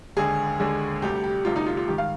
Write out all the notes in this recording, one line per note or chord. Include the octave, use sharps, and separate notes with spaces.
D#2 D3 G#3 G#4
D#2 D3 G#3
D2 C3 G3 G4
G4
D2 C3 G3 F4
D#4
F4
F4
G#2 D#3 G3 G4
F5